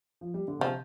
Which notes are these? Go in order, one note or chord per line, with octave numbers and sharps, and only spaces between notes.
F3
G3
D3
C3 F3